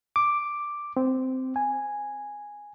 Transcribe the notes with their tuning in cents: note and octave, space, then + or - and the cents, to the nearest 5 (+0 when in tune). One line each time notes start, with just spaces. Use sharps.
D6 +0
C4 -10
G#5 -5